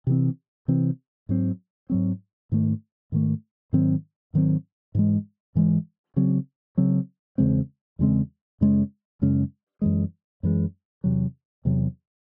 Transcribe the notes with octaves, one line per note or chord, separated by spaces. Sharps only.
C3 E3 C4
C3 E3 C4
G#2 F#3 C4
G#2 F#3 C4
G#2 D#3 A3
G#2 D#3 A3
G#2 D#3 F#3 C4
G#2 D#3 F#3 C4
G#2 E3 G#3
G#2 E3 G#3
C#3 F#3 C4
C#3 F#3 C4
E2 C#3 G#3 C4
E2 C#3 G#3 C4
F#2 C#3 G#3 C#4
F#2 C#3 G#3 C#4
F#2 E3 G#3
F#2 E3 G#3
E2 C3 F#3
E2 C3 F#3